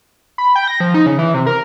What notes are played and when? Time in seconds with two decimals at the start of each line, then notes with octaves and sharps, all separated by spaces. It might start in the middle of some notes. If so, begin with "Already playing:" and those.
0.38 B5
0.56 G5
0.68 A#6
0.80 F3
0.94 D#4
1.06 C#3
1.19 E3
1.34 C3
1.47 A#4